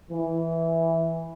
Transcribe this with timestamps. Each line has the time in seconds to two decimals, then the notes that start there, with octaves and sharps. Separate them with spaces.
0.12 E3